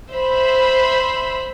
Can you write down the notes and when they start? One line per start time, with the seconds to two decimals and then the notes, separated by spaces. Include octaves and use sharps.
0.12 C5 E5 B5